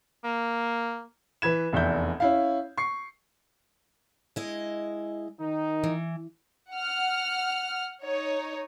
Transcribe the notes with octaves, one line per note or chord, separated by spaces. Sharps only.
A#3
E3 B4 G#6 E7
F1 E2 E5 G6
C#4 E4 F5
C#6 C7
G#3 E4 D#5
D#3 D#4
E3
F#5 F6
D#4 C#5